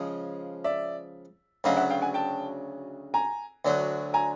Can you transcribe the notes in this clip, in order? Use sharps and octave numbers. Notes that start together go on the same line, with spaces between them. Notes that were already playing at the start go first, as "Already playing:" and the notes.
Already playing: C#3 F3 G#3
D5 E5
D2 C#3 F#3 D#5 F5
E5 F#5
F5 G5
F#5 G#5
G5 A5
G#5 A#5
D2 D3 F#3
G#5 A#5